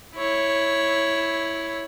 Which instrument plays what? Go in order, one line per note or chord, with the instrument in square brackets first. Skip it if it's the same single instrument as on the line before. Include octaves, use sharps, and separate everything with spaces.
[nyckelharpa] E4 C#5